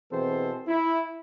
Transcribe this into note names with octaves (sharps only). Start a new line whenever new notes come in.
B2 E3 C4 G#4 A4 C5
E4